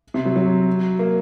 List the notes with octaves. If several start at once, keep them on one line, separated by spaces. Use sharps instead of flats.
C3
F#3
F#3
A#3